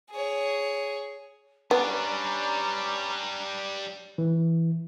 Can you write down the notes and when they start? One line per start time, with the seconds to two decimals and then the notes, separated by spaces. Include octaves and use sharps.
0.11 G#4 C#5
1.71 G3 B3 C#4 D4 B4 D5 A#5
4.18 E3